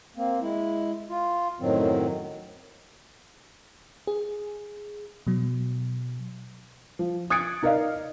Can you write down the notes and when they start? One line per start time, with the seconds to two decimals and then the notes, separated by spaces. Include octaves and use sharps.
0.17 A#3 C4
0.41 G#3 E4
1.09 F4
1.60 F#2 A2 D#3 F#3 C4
4.07 G#4
5.27 B2 F#3
6.99 F3
7.30 D#6 F#6 G#6 A6 C#7 D7
7.63 D#4 A#4 D5 D#5 F5